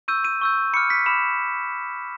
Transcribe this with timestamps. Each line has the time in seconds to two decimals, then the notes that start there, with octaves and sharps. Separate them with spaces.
0.08 C#6 E6 G6 D#7
0.25 D#7
0.41 C#6 E6 G6
0.73 B5 D6 F6 C#7
0.90 B6
1.06 B5 D6 F6 E7